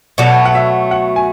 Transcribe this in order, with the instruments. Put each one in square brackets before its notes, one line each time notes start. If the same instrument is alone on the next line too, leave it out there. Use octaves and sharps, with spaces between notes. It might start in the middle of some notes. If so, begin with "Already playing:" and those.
[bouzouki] B2 F#3 A3 [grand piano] D5
[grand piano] F#5
E5
F#5
G#5